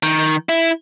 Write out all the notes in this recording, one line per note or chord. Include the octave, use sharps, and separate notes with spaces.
D#3
E4